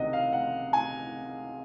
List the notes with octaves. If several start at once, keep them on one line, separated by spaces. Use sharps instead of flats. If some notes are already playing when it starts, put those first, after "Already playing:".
Already playing: C#2 C3 D#3 D#5 F#5
F5
F#5
G#5